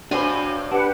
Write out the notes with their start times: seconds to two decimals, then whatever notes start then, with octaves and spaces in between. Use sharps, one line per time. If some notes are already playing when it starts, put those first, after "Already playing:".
0.11 G2 C3 C#4 D4 F#4 B4 C5 G#5
0.71 D4 G4 B4 F#5